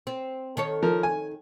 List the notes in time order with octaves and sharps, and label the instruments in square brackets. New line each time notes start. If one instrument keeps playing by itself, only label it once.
[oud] C4
D#3 A4 C#5
[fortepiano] F3 A#4
G#5